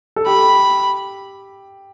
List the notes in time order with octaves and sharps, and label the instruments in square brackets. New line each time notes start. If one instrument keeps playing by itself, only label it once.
[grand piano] A4
[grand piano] G4 [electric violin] B5